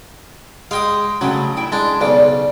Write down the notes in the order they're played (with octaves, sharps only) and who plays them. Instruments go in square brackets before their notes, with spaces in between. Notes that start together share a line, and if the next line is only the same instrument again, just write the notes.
[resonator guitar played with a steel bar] G#3 [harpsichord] F5 G5 D#6
[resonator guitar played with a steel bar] C#3 A3 G5 [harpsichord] F#3
[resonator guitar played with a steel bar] E4 G5
[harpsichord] G#3 D4
[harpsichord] B1 C#3 [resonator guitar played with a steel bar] D5